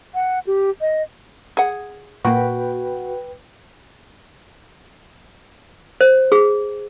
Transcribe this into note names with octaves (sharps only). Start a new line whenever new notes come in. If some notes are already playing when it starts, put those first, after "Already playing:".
F#5
G4
D#5
G#4 F#5
A#2 A#3 F#4 B4 G5
C5
G#4